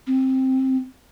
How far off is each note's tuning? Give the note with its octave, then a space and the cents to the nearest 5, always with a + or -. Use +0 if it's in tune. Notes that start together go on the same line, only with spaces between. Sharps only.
C4 +10